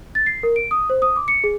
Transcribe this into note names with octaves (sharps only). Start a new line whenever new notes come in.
A6
C7
A#4
D7
D#6
C5
D#6
D6
C#7
G#4